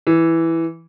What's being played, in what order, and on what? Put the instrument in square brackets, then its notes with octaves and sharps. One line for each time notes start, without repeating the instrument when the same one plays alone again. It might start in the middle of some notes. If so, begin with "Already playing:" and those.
[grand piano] E3